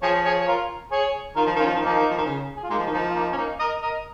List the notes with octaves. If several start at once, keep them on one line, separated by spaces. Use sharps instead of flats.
F3 G#4 C#5
G#4 C#5
C#5
F4 A#4
G#4 C#5
D#3 F4 A#4
F3
D#3 C#4 F4
F3
D#3
F3 A#3 D#4
D#3
F3
D#3
C#3
G#4
F4
G#3 A#3 D#4
F3
D#3
F3 A#3 D#4
F4
A#3 D#4
C#4
A#3 D#4
A#4 D#5
A#4 D#5